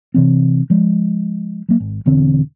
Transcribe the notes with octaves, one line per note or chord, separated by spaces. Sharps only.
C3 E3 C4
F3 G#3
F#3 A#3
G#1
E1 E2 D3 C4